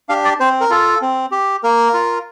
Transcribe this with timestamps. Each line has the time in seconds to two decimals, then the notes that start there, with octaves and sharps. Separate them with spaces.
0.09 D4 G4 F5
0.25 D5
0.40 C4 C5
0.61 A#4
0.70 F4 A4
1.01 C4
1.32 G4
1.63 A#3 A#4
1.94 F4